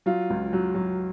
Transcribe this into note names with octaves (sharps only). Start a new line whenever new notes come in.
F#3 F4
C#2
F#3
F#3